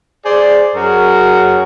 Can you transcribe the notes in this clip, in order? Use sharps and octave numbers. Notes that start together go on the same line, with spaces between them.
G#4 C5 D5
F#2 C#4 F#4 G#4 A#4